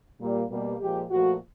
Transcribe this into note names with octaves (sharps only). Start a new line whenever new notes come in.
A#2 G3 A#3
B2 G3 A#3
A#2 F3 G#3 G4
A#2 F3 A3 F#4